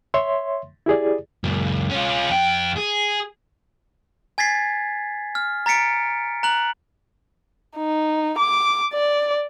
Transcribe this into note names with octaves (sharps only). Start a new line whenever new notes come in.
C#5 E5 C6
E4 G4 G#4 D5
C#2 F#2
C#4 F4
F2 G5
G#4
G#5 G#6 A6 B6 C7
F6
A#5 A6 B6 C#7 D7
A#5 F#6 F#7
D#4
D6
D5